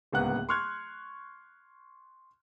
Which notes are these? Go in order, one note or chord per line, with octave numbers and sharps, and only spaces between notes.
D1 C#2 A#3 B3 F#5 F#6
C6 C#6 F6 F#6 G#6